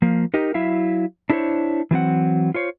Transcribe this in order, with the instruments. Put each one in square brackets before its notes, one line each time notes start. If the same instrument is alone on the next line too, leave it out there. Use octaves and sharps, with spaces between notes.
[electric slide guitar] F3 A#3
D#4 G4 A#4 D#5
F#3 E4 E5 F5
D4 E4 F#4 A4 C5 C#5
E3 F#3 C4 F#5
F4 C5 C#5